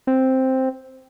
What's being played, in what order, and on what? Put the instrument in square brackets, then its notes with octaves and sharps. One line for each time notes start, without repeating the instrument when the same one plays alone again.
[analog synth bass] C4